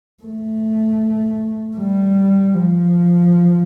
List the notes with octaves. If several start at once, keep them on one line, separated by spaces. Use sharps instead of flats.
A3
G3
F3